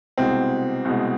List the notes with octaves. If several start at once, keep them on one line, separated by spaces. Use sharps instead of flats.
C2 B2 G#3 C4
C2 B2 G#3